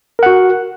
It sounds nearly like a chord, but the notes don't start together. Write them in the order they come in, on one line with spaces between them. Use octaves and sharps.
A#4 F#5 F#4